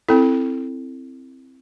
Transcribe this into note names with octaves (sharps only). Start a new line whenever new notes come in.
C4 E4 A4